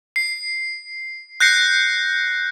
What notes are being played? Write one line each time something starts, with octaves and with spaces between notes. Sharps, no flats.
C7
F#6 G6 A#6 C7 C#7